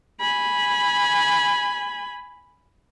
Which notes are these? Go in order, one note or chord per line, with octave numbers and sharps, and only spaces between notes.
G#5 B5